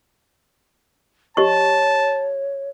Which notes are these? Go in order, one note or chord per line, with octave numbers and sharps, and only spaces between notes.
G4 C#5 D#5 A5 C#6